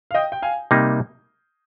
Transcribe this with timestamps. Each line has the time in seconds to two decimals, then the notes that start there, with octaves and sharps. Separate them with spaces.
0.11 F5
0.14 D#5 G5
0.32 G5
0.42 F5 G#5
0.71 C3 G3 A#3 D#4